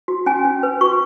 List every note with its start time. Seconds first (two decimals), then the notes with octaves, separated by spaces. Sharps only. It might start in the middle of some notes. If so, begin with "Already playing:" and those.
0.08 F#4
0.26 C#4 G#5
0.45 C#4
0.63 B4
0.81 F#4 C#6